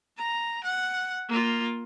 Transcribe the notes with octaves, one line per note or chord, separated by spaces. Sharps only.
A#5
F#5
A#3 F4